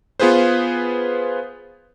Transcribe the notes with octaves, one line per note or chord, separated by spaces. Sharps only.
B3 F4 G#4 B4 C5